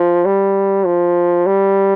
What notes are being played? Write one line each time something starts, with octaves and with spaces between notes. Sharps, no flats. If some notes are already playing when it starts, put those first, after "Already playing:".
Already playing: F3
G3
F3
G3